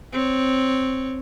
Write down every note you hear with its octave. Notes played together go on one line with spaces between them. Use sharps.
C4 C#5